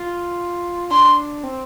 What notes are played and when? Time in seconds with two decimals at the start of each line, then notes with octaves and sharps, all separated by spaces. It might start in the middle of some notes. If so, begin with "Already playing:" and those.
Already playing: F4
0.91 D4 C6
1.44 C4